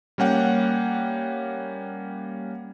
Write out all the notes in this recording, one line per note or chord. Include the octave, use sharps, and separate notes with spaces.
G3 A#3 C#4 F#5 G5